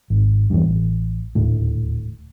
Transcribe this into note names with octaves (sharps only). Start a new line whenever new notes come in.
G#1
E2 G2
A1
D#1 D2 A2